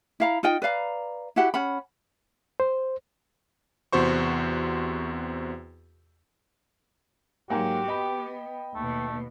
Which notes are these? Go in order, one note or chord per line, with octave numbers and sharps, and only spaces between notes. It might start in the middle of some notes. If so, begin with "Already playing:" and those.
E4 F5 A#5
D#4 F4 D#5 G5
B4 D5 F5 A#5
E4 F#4 G4 F#5
C#4 F#5 B5
C5
E2 C3 F#4 C5 C#6
G#2 F#3 A#3 F#4 G4 G#5
B3 D#5 G5 B5
D#2 B2 A3